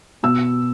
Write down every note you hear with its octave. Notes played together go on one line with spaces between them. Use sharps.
B2 E6